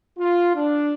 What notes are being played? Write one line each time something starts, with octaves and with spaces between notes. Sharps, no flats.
F4
D4